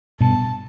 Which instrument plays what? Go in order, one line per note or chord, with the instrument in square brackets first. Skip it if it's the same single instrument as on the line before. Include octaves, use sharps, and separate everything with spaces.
[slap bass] G2 B2 [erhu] A5